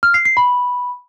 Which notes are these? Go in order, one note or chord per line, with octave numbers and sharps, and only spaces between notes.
F6
C7
C7
B5